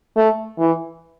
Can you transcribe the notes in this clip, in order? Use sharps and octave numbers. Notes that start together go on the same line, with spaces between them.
A3
E3